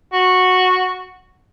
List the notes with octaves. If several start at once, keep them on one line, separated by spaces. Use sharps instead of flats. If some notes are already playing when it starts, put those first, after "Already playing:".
F#4